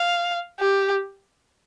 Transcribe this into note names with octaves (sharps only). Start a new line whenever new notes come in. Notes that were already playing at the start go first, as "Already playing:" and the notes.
Already playing: F5
G4